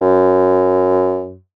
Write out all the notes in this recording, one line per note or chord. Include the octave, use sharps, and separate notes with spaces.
F#2